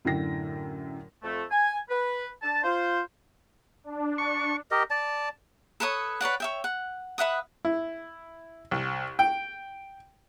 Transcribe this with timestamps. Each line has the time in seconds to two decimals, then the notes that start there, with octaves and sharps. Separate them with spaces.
0.05 F#2 A2 D3 G5 A#6
1.23 F2 A3
1.51 G#5
1.90 B4
2.43 D4 A5
2.64 F4 C5
3.84 D4
4.18 C#6
4.71 G4 A#4 D#5
4.90 D5 A5
5.80 A4 B4 C#5 D#6
6.21 B4 C#5 D5 F#5
6.40 C#5 E5 G5
6.64 F#5
7.18 B4 E5 F#5 D#6
7.65 E4
8.71 C2
9.19 G5